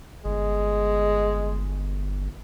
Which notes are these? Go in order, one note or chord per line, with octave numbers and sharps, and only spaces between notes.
G1 G#3